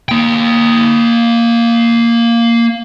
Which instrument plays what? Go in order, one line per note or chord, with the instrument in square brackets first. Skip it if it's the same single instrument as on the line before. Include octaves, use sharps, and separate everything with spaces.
[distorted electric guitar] A#3 G5